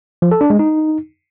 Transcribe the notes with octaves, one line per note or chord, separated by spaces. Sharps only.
F3
A4
D4
G#3
D#4